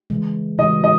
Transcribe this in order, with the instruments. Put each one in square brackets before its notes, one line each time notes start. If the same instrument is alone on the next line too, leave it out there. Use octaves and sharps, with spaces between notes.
[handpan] C#3 E3 G#3
[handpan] C#3 E3 G#3 [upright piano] D#5
[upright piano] D#5